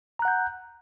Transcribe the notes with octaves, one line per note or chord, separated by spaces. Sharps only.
F#5 A#5 F#6 G6